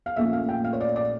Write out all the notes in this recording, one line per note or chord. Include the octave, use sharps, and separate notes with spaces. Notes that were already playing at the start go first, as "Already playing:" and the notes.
F5
A#1 A#2 A3 C#4 E5
F5
G5
F5
C#5
D5
D5